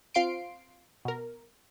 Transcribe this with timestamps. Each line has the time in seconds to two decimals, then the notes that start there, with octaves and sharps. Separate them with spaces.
0.15 C4 F4 F5 C6 C7 D7
1.05 B2 A#4